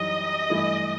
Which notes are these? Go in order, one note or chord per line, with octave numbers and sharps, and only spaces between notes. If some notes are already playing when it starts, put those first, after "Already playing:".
Already playing: F#2 E3 G3 D#4 G4 D#5
G2 E3 A3 E4